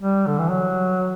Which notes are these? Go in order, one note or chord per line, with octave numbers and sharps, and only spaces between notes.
G3
D3
E3
F#3